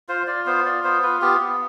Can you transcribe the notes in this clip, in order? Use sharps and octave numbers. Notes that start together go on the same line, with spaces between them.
F4 C5
F4 D5
B3 C5
F4 D5
B3 C5
F4 B4
B3 G4
B3